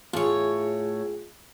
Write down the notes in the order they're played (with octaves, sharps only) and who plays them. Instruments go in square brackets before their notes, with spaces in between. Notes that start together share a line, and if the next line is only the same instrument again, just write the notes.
[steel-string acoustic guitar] A2 C#5 [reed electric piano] F4 G#4